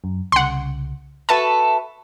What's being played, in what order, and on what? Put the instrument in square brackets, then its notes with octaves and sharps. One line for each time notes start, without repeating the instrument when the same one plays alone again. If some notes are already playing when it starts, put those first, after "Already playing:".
[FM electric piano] F#2
[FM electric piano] C2 C#3 [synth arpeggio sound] F#5 C6
[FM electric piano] F#4 E5 B5 [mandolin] A4 B4 C#6 [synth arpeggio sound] A5